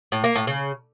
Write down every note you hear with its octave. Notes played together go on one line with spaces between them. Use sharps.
A2
A#3
A2
C#3